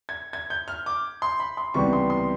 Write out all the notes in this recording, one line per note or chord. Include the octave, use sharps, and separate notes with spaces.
G#6
G#6
G6
F6
D6
C6
B5
C6
C#2 C3 E3 G3 B3 C#6
C6
C6